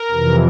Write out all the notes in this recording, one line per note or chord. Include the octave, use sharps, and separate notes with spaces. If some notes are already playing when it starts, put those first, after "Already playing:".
Already playing: A#4
F2 C3 E3